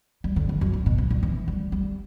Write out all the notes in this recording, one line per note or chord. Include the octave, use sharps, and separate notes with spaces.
G3
D3
C#3
F#2
G2
B2
C#3
D3
E3
G3
G3